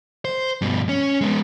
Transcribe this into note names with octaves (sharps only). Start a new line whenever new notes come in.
C5
G2 B2
C#4
G#3 B3